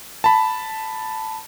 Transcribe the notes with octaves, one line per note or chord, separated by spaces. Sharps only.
A5 B5